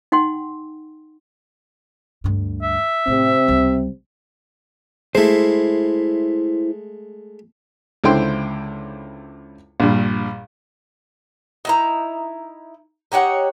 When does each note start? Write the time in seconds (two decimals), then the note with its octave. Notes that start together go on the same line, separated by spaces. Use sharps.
0.12 D#4 F#5 G5 C6
2.24 D2 G2
2.63 E5
3.07 A2 C3 C4
3.48 C#2 G3
5.15 G#3 A3 E4 C5
8.04 C#2 D3 E4 C5 G5 C6
9.80 A#1 G2
11.65 D#4 E4 A#5
13.12 D#4 G4 C#5 F#5